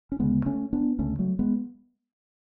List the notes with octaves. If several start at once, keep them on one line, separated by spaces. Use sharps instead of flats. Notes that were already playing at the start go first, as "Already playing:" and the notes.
C#4
D2 C#3 G#3 B3
A3 C#4
B3 D4
D2 C#3 A3 C#4
F#3 A3
G#3 B3